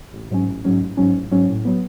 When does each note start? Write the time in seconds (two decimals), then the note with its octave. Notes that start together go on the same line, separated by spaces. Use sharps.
0.13 A1
0.31 G#2 F#3 C#4
0.47 A1
0.64 G#2 F#3 C#4
0.81 A1
0.97 G#2 F#3 C#4
1.15 A1
1.31 G#2 F#3 C#4
1.49 A2
1.65 F#3 B3